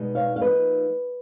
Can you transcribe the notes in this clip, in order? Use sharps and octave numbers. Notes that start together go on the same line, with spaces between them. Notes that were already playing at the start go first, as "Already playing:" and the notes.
Already playing: B2 G#3 B3 D#4
C#5 F5
F5
F3 A#3 D#4 B4 D#5